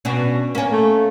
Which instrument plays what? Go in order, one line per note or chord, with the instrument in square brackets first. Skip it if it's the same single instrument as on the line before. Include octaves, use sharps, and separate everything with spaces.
[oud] B2 C#4 D4
A#3 C#4
[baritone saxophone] A3